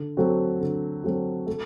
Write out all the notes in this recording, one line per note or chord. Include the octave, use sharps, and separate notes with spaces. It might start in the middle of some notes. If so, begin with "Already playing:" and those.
Already playing: D3
F#3 A3 C4 F#4
D3
F#3 A3 C4 F#4
A3